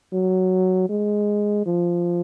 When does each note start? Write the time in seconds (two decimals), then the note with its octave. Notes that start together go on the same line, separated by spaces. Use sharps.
0.13 F#3
0.90 G#3
1.66 F3